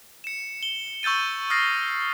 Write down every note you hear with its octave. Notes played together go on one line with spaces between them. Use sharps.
C#7 E7
G7
C#6 E6 G6 A6 D#7
D#6 F6 A6 A#6 C7